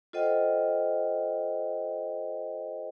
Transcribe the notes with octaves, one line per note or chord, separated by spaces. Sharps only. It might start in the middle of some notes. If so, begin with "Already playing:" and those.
F4 A4 C5 D#5 F#5 G5